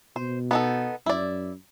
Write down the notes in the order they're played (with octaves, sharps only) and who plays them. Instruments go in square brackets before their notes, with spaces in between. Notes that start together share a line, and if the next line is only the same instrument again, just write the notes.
[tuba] B2 [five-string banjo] C5
[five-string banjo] B3 D#4 A4
[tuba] F#2 [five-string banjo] E4 D5